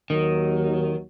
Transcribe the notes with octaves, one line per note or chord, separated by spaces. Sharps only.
D#2 D#3 F#3